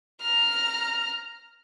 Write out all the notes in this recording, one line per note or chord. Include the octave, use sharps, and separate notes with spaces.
A#5 F6